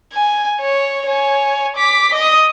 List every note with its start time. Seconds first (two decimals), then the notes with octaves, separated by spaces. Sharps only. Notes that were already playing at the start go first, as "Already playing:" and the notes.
0.13 G#5
0.61 C#5
1.06 C#5 G#5
1.76 D6 B6
2.13 D#5 D#6